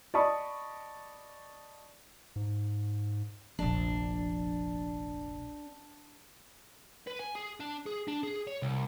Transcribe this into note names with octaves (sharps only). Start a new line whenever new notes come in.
D5 D#5 A5 B5 C#6 D#6
G#2
F1 A#1 D4
B4
G#5
G#4
D4
G#4
D4
G#4
C#5
C2